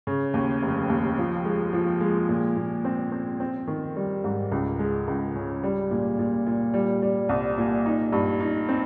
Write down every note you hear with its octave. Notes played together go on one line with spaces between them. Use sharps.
C#3
D#2
F1
D#2
F3
G#3
F3
G#3
A#2
A#2
C4
C4
C4
D#3
G3
G#2
C#2
G#3
C#2
C#3
G3
A#2
A#2
A#2
G3
G3
C2
A#2
D#4
G2
D#4
C4